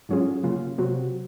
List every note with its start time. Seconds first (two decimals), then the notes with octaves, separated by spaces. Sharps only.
0.09 G#2 F#3 C#4 F4 G#4
0.43 C#3 F#3 A#3 F4
0.78 C3 F#3 C4 F#4